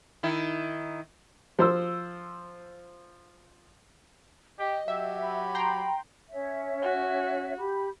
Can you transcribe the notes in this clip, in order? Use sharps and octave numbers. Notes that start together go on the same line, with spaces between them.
D#3 E4
F3 C5 E6
G4 D#5
F#3 G4 E5
B5
G5 A#5 C6
C#4 C#5 E5
F#4
G4 B5